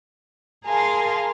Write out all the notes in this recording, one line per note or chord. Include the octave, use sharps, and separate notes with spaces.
G#4 A#4 F5 G#5 A5 C6